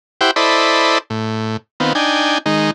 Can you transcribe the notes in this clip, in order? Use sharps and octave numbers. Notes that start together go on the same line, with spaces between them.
E4 G4 C5 F#5 G5
E4 A4 C5 D5 D#5 B5
A2
D#3 B3 C4 F4
D4 D#4 G5 G#5
D#3 G#3 D#4